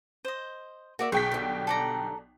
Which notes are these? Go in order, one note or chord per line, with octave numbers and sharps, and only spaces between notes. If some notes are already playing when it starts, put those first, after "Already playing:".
C5 D#5
A#3 F#4 D5 E5
B1 G#4 G5 C#6 B6
D3 G3
A4 D5 A#5